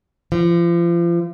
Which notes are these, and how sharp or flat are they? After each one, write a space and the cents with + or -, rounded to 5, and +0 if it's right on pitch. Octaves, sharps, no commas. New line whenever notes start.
F3 -35